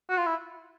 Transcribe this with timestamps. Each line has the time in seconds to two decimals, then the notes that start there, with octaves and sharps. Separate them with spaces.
0.09 F#4
0.18 F4
0.26 E4